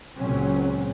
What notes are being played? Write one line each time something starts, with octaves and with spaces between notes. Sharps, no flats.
C#2 A#2 F#3 C4 C#4